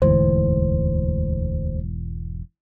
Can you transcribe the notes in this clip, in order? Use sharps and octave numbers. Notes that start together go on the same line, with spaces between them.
E1 D2 G#2 E3 C5